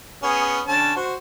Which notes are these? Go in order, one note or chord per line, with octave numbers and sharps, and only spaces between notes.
B3 C#4 G#4
D3 C#4 A5
F#4 C5